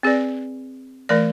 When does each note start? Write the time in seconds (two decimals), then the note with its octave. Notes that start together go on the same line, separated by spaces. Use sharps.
0.03 C4 G#4 B4 D5
1.09 E3 A3 A#4 D5